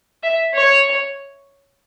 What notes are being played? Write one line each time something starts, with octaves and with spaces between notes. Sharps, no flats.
E5
C#5